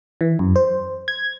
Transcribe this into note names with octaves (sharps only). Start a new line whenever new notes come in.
E3
F#2
C5
G#6